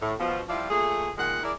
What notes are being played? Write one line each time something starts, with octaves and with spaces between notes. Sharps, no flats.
A2
B2 F3
F3 G3 E4 F4 D5
A#2 A3 G#4
A#2 D#3 G#3 F#5
E4 G#4 A#4 D5